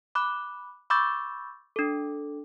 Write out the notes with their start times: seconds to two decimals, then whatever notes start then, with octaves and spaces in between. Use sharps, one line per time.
0.15 B5 D6 F#6
0.90 B5 C#6 D6 E6 G6 A6
1.76 D4 A4